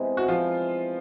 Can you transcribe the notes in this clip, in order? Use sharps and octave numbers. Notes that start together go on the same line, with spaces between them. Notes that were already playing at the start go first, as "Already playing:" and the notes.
Already playing: C3 E3 G#3 B3
F#4
F3 F4